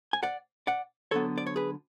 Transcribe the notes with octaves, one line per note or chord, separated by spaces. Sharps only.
G#5
D5 F#5
D5 F#5
D2 D3 F#3 B3 A4 C#5
D5
C#5
G#4 B4